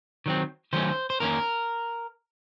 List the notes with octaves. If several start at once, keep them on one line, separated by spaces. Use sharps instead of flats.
D#3 F#3 C4
D#3 F#3 A3 C#4 C5
C5
D#3 A#3 C#4 A#4